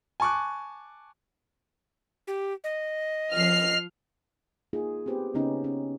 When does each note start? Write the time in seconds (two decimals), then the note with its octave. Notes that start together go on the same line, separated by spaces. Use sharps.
0.20 G#5 A5 C#6 D6 F#6
2.27 G4
2.64 D#5
3.31 F3 F6 C7
4.73 A#3 D#4 F4 G#4
5.06 B3 C4 G4 B4 C5
5.34 C#3 A#3 B3 C#4 D#4
5.64 C#4